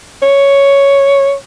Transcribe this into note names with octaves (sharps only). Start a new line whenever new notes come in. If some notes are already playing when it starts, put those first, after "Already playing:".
C#5